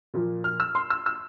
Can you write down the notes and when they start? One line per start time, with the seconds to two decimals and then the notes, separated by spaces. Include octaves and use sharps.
0.14 A#2 F3 A#3 F4
0.44 F6
0.60 E6
0.75 C6
0.90 E6
1.06 E6